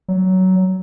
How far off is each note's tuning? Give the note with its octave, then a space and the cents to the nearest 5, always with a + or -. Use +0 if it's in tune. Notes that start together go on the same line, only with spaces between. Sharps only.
F#3 +15